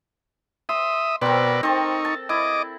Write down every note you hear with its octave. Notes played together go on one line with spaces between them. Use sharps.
E5 C6 D#6
B2 C4 A#4 B4 D5
C4 D#4 A4 C#6
A5
E4 D#5 D6